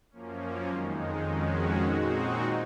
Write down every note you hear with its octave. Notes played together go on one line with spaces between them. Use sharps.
F#2 F3 A#3 C#4
F2 D#3 G#3 D#4
F2 D#3 G#3 C#4 F#4
A#2 G#3 C4 D#4 F#4